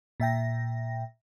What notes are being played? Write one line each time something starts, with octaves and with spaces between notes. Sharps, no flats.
A#2 E5 G5 A#6